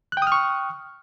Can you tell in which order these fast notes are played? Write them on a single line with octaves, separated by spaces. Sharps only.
F#6 G5 D#6 F6 C#6